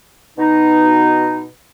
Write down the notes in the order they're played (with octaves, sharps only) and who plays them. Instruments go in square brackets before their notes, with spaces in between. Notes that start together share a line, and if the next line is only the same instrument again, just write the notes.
[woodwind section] B2 D#4